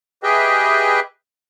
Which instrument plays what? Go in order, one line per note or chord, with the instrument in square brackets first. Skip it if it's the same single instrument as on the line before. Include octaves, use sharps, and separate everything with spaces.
[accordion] G4 G#4 B4 D#5 E5 G5